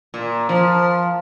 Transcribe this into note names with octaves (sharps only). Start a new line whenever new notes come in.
A#2
F3